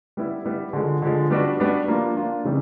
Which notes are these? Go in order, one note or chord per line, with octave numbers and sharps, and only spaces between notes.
G3 B3 E4
G3 B3 E4
D3 F3 G#3
D3 F3 G#3
G3 B3 D4 F#4
G3 B3 D4 F#4
F3 A#3 D4 F4
F3 A#3 D4 F4
C#3 E3 G3 C4